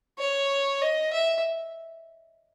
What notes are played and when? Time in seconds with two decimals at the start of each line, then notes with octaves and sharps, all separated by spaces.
0.18 C#5
0.81 D#5
1.13 E5